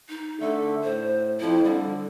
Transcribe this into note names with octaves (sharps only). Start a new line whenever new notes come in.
D#4
D3 A3 A4
A2 C5
F2 F3 E4
D3 G3